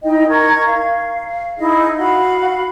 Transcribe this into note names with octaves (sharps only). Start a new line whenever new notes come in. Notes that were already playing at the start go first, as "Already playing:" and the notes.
D#4 E4 D#5 G5
A#4 A#5 C#6 G#6
F5
D#4 E4 G#4 D#5
F#4 F5 B5